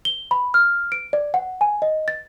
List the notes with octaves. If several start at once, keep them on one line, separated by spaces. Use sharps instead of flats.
G7
B5
F6
D7
D5
F#5
G#5
D#5
A6